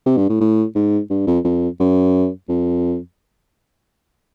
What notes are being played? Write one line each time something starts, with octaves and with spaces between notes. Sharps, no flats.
C3
G2
A2
A2
G#2
G2
F2
F2
F#2
F2